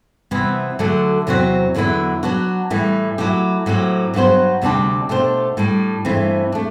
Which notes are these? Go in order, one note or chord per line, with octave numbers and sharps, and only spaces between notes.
C3 E3 G3 B3 E4
D2 D3 F#3 A3 D4
E2 C3 F#3 C4 F#4
E2 D3 F#3 B3 E4
F#3 B3 D4 F#4
A2 E3 G3
F#3 A3 E4 G4
A2 F#3 C4 G4
G2 F#3 B3 F#4 C5
D2 C3 G3 D4 G4
B2 A3 D4 G4 C5
A2 G3 D4
G2 E3 A3 C4
A3 D4